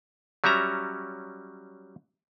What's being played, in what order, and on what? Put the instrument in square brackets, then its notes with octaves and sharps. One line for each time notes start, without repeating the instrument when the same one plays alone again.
[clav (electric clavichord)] F#3 G3 C#4 E5 A#5